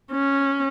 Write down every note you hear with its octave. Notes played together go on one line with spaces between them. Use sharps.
C#4